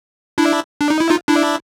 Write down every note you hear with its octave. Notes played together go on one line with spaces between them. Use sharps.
D4 E4
D4
D#4
E4
D#4 F4
D4 E4